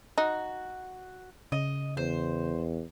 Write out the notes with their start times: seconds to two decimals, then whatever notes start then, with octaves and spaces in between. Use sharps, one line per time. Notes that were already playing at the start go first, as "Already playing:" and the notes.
0.18 D#4 F#4
1.52 C#3 D#5
1.97 E2 C5